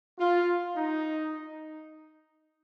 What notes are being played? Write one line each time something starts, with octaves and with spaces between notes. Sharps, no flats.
F4
D#4